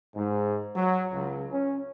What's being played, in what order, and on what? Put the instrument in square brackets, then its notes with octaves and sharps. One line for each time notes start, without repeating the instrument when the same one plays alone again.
[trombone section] G#2
F#3
C#2
C#4